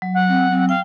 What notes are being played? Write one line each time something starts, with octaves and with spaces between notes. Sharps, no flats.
F#3
F#5
C4
C4
F5 G5